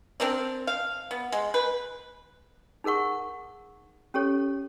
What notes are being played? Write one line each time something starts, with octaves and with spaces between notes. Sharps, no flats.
C4 D4 A#4 D5
F5
B3
G#3
B4
D#4 G#4 A#4 F#5 C#6
C#4 G4 A4 C#5